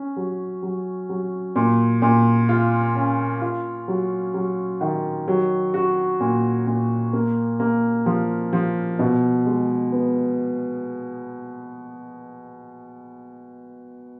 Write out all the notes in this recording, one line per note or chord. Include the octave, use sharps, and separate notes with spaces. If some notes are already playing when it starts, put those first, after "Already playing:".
Already playing: C#4
F#3
F#3
F#3
A#2
A#2
F4
C#4
F4
F#3
F#3
D#3
F#3
F#4
A#2
A#2
A#3
A#3
F3
F3
B2
G#3
B3